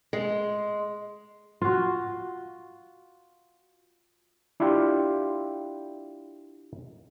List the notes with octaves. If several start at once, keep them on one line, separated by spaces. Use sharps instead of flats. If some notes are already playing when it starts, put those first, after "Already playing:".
G#3
F4 F#4
D4 E4 F4 G4